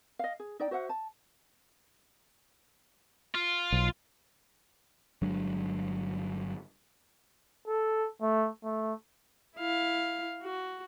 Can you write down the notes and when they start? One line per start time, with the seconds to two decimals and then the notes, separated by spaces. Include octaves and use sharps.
0.19 D#5 F5
0.40 G#4
0.59 D#4 D5 G5
0.71 F#4 C5 E5 F#5
0.89 A5
3.35 F4
3.72 B1
5.22 G1 F#3 G#3 D4
7.67 A4
8.22 A3
8.64 A3
9.57 E4 F5
10.43 F#4